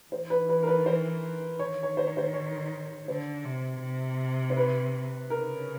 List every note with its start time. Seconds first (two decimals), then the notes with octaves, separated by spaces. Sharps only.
0.12 E3 C5
0.30 B4
0.49 B4
0.63 A#4
0.67 B4
0.86 C5
1.59 D#3 C#5
1.83 C#5
1.97 C5
2.07 C#5
2.17 C5
2.34 C#5
3.08 D3 C5
3.45 C3
3.82 C3
4.50 C5
4.57 B4
5.30 C#3 A#4